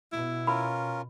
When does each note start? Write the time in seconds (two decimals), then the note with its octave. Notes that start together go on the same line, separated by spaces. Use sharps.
0.12 B2 E4
0.47 C#4 F4 A#4 B5